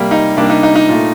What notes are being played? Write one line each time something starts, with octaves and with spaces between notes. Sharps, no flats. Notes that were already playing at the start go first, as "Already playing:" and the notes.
Already playing: C3 G3 A#3
D#4
C3 G3 A#3 D4
D#4
D#4
D#4
A#2 A3